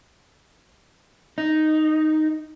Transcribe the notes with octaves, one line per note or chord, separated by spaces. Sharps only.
D#4